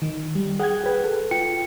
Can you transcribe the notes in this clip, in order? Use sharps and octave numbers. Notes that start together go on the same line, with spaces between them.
D#3
G3
G#4 F#5 G5 G#6
G#4 B4
A4
F4 G5 C#7